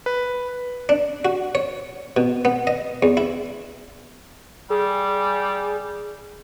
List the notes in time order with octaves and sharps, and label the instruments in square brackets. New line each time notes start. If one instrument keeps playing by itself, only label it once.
[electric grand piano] B4
[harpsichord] D4
F#4
C#5
B2
B3
D#5
E2
E4
[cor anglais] G3 [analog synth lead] G#4